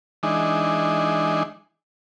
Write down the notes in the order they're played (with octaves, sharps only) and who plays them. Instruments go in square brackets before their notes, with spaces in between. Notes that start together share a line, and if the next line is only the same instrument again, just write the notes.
[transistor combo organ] E3 G#3 D4 D#4